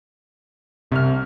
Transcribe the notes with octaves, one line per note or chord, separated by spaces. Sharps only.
C2 C3 F6